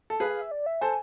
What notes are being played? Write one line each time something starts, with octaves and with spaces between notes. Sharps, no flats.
A4
G#4 B4 F5
F5
E5
D5
E5
A4 C5 G#5